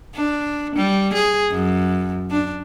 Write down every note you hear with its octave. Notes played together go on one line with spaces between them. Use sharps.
D4
G3
G#4
F#2
D4